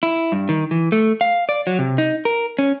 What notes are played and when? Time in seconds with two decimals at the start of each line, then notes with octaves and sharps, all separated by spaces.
0.03 E4
0.32 G2
0.49 D#3
0.71 E3
0.92 A3
1.21 F5
1.49 D5
1.67 F#3
1.79 C3
1.98 D#4
2.25 A#4
2.59 C#4